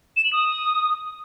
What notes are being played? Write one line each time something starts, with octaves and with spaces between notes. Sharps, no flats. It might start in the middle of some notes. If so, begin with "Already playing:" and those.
E7
F#7
D#6